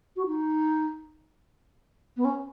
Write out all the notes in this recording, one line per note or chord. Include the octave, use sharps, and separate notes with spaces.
F#4
D#4
B3
C#4